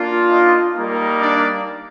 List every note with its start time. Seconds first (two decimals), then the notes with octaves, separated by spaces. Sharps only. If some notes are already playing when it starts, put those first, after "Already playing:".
Already playing: A#3 D4 F4
0.29 D#4 D#5
0.74 G3 A#3 D#4
1.20 D4 D5